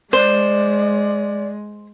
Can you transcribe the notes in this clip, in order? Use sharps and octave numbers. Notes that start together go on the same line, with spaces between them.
G#3 C5 D5